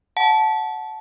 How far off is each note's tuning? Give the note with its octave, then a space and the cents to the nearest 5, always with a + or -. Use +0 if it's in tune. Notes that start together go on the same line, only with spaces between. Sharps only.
F#5 -5 A5 -15